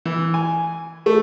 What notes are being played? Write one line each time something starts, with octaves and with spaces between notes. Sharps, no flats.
E3
G#5
A3